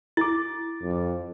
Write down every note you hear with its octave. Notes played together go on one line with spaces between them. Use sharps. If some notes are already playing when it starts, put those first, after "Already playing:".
E4 D6 A6
F2